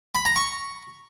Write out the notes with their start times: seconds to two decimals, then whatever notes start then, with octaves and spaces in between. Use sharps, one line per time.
0.15 B5
0.25 A#5
0.36 C#6